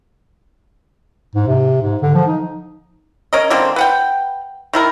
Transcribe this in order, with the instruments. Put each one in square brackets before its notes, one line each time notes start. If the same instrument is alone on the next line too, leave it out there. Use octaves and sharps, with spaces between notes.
[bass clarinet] G#2
C3
G#2
D3
F3
D#4
[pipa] C#4 A#4 D#5
D3 G3 A#3 C4
B4 F#5 G5
D#3 E4 A#4